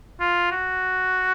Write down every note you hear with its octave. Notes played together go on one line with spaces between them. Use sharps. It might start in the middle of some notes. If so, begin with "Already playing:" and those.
F4
F#4